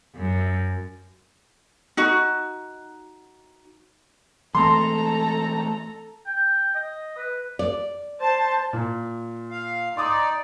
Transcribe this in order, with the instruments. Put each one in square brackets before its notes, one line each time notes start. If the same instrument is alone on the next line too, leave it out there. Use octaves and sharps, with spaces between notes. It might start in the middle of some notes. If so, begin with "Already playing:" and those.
[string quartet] F#2
[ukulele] D#4 F#4
[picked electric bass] E3 A3 C4 [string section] A4 A#5 [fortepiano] C6
[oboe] G5
D#5
B4
[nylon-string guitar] D5
[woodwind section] C5 [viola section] A5
[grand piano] A#2
[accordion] F5
[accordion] D#4 D5 [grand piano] C6 D6 D#6